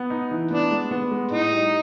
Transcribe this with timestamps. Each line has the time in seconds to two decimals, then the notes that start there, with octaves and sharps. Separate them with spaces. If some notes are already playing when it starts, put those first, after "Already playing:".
Already playing: B3
0.10 D#4
0.31 E3
0.51 B3 D4
0.71 G#3
0.91 B3
1.11 G#3
1.31 A2 D#4
1.51 G3